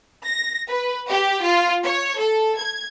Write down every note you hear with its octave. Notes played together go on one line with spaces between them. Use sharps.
A#6
B4
G4
F4
C#5
A4
G#6